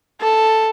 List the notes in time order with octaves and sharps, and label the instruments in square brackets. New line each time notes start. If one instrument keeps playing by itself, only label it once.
[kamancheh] A4